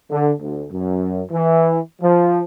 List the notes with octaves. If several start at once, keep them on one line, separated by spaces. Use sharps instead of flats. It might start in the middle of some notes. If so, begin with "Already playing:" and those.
D3
D2
F#2
E3
F3